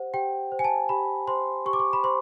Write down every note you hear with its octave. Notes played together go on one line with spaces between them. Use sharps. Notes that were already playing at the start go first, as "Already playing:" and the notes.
Already playing: G4 C5 F#5
G4 G5
C5
G#5
A5
G4 B5
C5 C6
G4 C#6
D6
C#6
B5
C5 C6